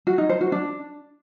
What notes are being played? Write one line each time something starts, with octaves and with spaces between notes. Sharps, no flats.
F#4
D#4
C5
F#4
D4